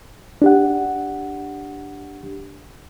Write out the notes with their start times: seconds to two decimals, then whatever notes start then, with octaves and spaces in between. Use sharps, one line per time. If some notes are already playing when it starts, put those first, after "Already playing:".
0.42 D4 G4 F#5